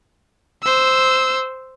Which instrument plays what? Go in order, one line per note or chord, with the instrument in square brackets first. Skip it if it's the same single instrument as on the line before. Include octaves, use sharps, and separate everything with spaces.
[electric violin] C5 E6